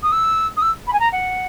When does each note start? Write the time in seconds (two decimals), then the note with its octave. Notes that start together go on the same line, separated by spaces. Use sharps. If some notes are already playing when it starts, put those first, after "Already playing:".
0.03 D#6
0.12 E6
0.57 D#6
0.62 E6
0.87 B5
0.93 G#5
1.00 A#5
1.12 F#5